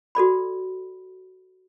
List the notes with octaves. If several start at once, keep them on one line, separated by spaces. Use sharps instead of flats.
F#4 A4 D5 B5